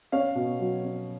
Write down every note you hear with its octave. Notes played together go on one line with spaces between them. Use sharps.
C#4 C#5 F5
B2
F#3
C#4